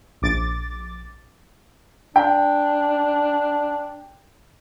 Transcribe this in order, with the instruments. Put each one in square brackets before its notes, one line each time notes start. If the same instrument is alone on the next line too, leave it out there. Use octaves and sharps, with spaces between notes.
[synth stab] A#1 D6 A6
[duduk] D4 [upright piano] G5